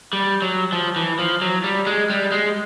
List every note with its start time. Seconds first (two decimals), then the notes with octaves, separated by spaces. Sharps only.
0.13 G3
0.42 F#3
0.72 F3
0.96 E3
1.19 F3
1.42 F#3
1.64 G3
1.87 G#3
2.10 G3
2.32 G#3